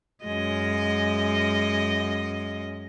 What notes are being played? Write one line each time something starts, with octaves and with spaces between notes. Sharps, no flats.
F#2 G#3 D#5